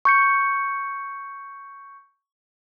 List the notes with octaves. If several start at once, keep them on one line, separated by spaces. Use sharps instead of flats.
C#6 G6 C#7